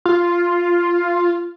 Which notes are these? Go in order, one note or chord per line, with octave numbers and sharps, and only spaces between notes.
F4